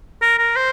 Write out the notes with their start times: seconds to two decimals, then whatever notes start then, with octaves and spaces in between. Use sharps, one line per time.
0.22 A#4
0.39 A#4
0.56 C5